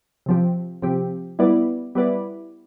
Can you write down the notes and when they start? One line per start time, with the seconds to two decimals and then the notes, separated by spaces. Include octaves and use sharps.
0.26 C3 F3 C4 G4
0.82 C3 F3 C4 G4
1.39 G3 B3 E4 B4 D5
1.95 G3 B3 E4 B4 D5